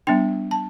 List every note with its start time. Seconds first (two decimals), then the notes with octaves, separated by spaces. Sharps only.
0.07 G3 B3 D4 G5
0.51 A5